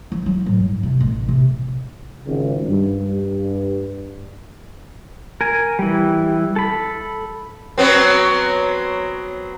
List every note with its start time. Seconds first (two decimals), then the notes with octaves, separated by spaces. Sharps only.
0.12 F3
0.26 F#3
0.46 A2
0.60 G2
0.83 C3
1.00 A1
1.28 C3
2.26 G#1 C#2
2.68 G2
5.41 A#4 G#5
5.79 E3 G3
6.56 A4 B5
7.78 F#3 B3 C4